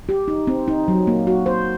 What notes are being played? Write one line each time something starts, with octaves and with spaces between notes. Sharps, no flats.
G4
D#4
C4
D#4
F#3
A#3
F#4
C5